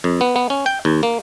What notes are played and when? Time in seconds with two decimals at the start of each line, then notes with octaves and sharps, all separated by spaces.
0.04 F2
0.21 B3
0.36 B3
0.50 C#4
0.66 G5
0.85 D#2
1.03 A#3